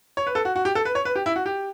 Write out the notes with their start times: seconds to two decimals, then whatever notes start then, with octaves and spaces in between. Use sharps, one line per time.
0.17 C#5
0.27 B4
0.35 A4
0.45 F#4
0.56 F#4
0.65 G4
0.75 A4
0.85 B4
0.95 C#5
1.05 B4
1.16 G4
1.26 E4
1.36 F#4
1.46 G4